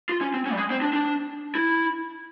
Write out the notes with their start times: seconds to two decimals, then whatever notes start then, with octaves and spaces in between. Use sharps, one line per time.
0.09 F4
0.21 C#4
0.34 C4
0.46 C#4
0.52 G3
0.57 G#3
0.70 C4
0.82 D4
0.93 D4
1.55 E4